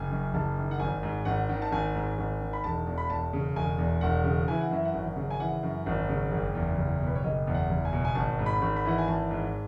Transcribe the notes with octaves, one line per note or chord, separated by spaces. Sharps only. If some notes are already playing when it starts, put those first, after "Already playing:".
Already playing: F#1 G#5
F#2
F#1 A5
D#3
F#5
G#1 G#5
G#2
G#1 F#5
D#3
A5
G#1 G#5
G#2
G#1
D#3
B5
E1 A5
E2
B5
E1 A5
C#3
E1 G#5
E2
E1 F#5
C#3
E3 G#5
F#5
F#2 E5
F#5
G#1
C#3
G#5
E3 F#5
F#2
G#1
C#3
F#1
E2
F#1
B2
B4
C#5
F#1 D#5
E2
F#5
F#1
G#5
B2
G#5
G#1 A5
G#2
B5
G#1
B5
E3 F#5
G#5
G#1 A5
G#2